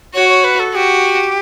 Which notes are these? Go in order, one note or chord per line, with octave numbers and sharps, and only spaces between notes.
F#4 C#5
C#5
B4
A4
F#4 G4